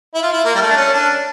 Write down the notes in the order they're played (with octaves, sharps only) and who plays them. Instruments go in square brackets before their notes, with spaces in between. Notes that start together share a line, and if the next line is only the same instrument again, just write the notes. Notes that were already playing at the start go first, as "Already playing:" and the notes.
[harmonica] E4
F4
E4
A#3
G3
A3
D4
C#4
D4